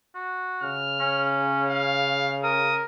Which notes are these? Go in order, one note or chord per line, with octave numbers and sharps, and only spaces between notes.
F#4
C#3 F6
C#4
F5
A#4 D#6